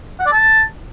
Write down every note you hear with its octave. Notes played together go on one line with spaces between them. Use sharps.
F#5
D5
A5